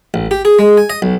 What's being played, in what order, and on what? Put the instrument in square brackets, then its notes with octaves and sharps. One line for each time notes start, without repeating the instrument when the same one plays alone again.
[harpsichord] A1
G4
G#4
G#3
G#5
D#5
B1